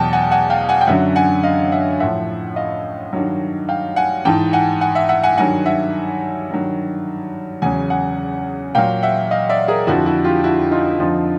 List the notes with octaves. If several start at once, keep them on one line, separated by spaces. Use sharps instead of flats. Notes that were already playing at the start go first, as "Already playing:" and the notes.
Already playing: E2 B2 F#3 G5 A5
F#5 G#5
F#5 G#5
F5 G5
F#5 G#5
G5
F#2 D3 F#3 E5 F#5
F#5 G#5
D#5 F5
E5 F#5
A2 F3 E5 F#5
D#5 F5
G2 D#3 F#3
F5 G5
F#5 G#5
G#2 E3 G5 A5
F#5 G#5
F#5 G#5
E5 F#5
E5 F#5
F#5 G#5
G2 D#3 F#3 F#5 G#5
E5 F#5
G2 D#3 F#3
E2 C#3 F#3 F#5 G#5
F#5 G#5
A#2 F#3 F5 G5
E5 F#5
D#5 F5
D5 E5
G#4 A#4
F2 D3 F3 E4 F#4
E4 F#4
F4 G4
E4 F#4
D#4 F4
F2 D3 F3 D#4 F4